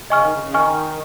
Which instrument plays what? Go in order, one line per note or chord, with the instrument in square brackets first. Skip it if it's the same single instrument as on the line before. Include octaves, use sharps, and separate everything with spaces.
[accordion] C#3 [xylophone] D#5 G#5 C#6 F6
[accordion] D#3
C#3
C#3
[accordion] D#3 [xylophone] D#5 G#5 C#6 F6